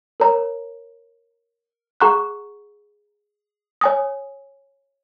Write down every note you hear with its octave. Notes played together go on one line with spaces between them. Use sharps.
A#4 C#5 A#5
G#4 F#5 A#5 C#6 F#6
C#5 G#5 D#6